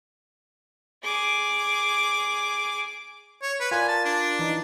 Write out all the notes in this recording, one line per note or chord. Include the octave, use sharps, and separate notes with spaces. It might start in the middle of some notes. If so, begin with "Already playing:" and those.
G#4 D6
C#5
B4
F4 A#4 D5 G#5
A5
D4
E3 D#4